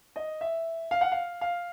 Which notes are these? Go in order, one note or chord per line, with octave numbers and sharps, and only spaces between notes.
D#5
E5
F5
F#5
F5
F5